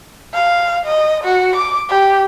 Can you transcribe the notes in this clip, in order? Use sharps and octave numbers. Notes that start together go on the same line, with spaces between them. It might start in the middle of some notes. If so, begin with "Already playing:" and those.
F5
D#5
F#4
D6
G4